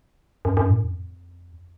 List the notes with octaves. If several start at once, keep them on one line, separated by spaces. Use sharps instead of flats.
F#2
F#2
A2
F2